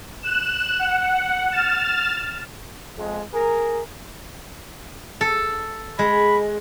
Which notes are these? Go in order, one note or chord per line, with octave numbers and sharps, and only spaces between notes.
F#6 E7
F#5
F6 A6 E7
F2 G#3
G#4 A#4
A4
G#3 B5